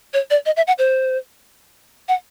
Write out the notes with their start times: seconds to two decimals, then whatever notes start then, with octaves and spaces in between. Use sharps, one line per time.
0.14 C#5
0.30 D5
0.46 D#5
0.57 E5
0.67 F#5
0.79 C5
2.08 F#5